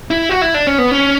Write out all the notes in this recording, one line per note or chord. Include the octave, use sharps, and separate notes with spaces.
E4
F#4
E4
D4
C#4
B3
C#4